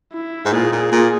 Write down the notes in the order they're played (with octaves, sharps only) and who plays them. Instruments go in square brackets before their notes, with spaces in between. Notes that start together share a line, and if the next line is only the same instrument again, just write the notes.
[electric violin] E4
[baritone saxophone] G#2
[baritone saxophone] A#2 [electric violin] G#4
[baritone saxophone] A#2
A#2